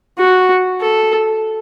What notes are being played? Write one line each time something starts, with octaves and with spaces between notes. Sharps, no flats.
F#4
A4